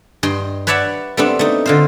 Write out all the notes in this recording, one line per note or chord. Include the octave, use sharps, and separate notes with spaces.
G2 D#5 G5 C6
B4 C#5 D5 E5 F#5 A5
G3 A3 B3 C4 D4
A3 D#4
D3 F4 C5